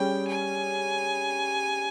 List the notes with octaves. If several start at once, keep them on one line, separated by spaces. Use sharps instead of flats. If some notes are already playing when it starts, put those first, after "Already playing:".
Already playing: G3 C#4 G#4 G5
G#5